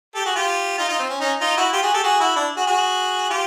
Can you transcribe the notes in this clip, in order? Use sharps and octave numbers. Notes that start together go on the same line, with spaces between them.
G4 A4
F#4 G#4
F4 G4
D#4 F4
D#4 F4
C4
C#4
C#4 D#4
D#4 F4
E4 F#4
F4 G4
F#4 G#4
G4 A4
F#4 G#4
E4 F#4
D4 E4
F#4 G#4
F#4 G#4
F4 G4